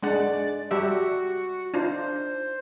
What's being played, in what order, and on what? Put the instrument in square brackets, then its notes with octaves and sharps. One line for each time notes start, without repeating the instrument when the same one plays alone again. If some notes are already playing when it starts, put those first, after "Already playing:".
[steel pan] G#3 D4 F#5 [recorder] D5
[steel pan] G3 G4 E5 [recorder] F#4
[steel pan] D4 D#4 F4 [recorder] C5